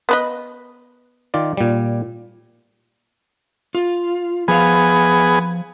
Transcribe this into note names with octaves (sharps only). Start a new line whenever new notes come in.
B3 B4 D#5
D#3 F4 D5
A#2 G3
F4
F3 B3 G#4 F5